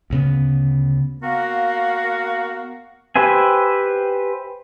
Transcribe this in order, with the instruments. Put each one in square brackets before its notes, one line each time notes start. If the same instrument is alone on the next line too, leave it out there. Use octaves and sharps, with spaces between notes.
[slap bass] D2 C#3 B3
[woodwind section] A#3 B3 F#4 A#4 F5
[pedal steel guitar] G4 B4 C5 E5 G#5